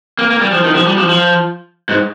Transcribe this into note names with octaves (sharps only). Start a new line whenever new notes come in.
A#3
A#3
G3
F3
D#3
F3
G3
F3
F3
G#2